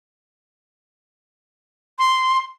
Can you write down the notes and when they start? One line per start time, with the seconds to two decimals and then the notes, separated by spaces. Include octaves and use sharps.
1.99 C6